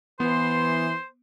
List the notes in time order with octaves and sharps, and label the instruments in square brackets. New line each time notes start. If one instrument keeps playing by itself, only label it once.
[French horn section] E3 [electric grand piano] B3 [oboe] C5 [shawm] C6